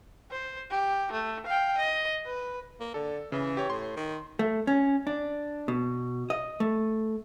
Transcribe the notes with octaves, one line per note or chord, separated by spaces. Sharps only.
C5
G4
A3
F5 G5
D#5
B4
A#3
D3 A4
C#3 E3
G4 C#5
A2 C6
D#3
A3
C#4
D4
B2
D#5
A3